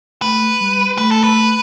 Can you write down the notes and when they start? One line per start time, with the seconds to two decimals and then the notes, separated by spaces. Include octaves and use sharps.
0.22 A3 B4
0.61 G3
0.98 A3 B4
1.11 A4
1.24 B4